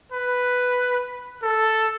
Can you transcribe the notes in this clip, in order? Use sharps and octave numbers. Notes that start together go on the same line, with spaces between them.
B4
A4